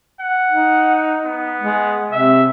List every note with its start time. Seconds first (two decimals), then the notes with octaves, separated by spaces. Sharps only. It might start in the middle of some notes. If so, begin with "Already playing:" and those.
0.20 F#5
0.52 D#4
1.25 B3
1.62 G#3
2.12 C3 E5